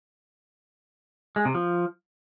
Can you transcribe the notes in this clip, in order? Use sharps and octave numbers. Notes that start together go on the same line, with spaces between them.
G#3
C3
F3